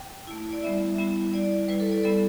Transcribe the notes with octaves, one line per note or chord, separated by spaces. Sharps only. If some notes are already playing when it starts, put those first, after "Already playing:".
Already playing: G5
A3 E4
D5
G3 B3 E4 E5
G3 B3 E4
G3 E4 D5
G3 E4 B4
A4
D5
G3 B3 E4 A4